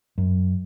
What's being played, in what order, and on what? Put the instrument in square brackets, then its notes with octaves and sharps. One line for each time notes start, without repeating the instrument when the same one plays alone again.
[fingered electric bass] F#2